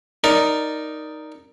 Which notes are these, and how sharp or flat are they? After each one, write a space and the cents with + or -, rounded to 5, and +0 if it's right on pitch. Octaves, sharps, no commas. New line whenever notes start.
D#4 +0 A#4 +0 D5 +0